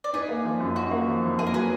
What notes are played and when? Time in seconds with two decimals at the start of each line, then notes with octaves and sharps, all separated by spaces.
0.04 D5
0.13 D#4 G#4 B4
0.29 A#3
0.45 F3
0.60 F#2
0.76 D#4 F#4
0.91 A#3
1.07 F3
1.23 F2
1.39 A#3 G#4
1.47 A#4
1.54 F#3 G#4 B4